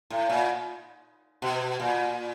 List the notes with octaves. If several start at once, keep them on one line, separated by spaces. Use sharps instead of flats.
A2
A#2
B2
A#2